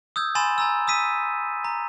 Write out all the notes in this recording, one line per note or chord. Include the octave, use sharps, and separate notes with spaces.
D#6 E6 G6 G#6
G#5 B5 C6 A6 E7
G#5 A#5 E6
D#6 E6 B6 D#7
A#5